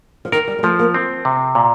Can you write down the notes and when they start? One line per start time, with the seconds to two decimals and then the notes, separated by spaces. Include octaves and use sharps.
0.25 F3
0.32 D#3 A#4
0.48 G3
0.59 G3
0.63 F3 A3
0.79 A#3
0.94 C4
1.25 C3
1.55 A#2